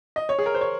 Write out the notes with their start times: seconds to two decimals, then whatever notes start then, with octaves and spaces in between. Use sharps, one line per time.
0.16 D#5
0.29 C#5
0.39 G#4
0.46 A#4
0.55 C5
0.61 C#5